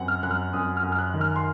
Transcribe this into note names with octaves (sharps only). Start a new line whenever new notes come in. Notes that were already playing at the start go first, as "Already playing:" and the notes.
Already playing: F#2 C4 F#5
F6
F#2 F#6
F6
F#2 D#6
F6
F#2
F6
F#6
D#3
F6
C6